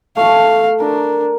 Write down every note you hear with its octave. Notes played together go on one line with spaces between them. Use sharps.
A3 F5
D4 A#4